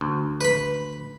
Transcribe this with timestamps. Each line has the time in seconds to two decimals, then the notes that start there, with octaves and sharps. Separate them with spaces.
0.01 D2
0.41 B4 B5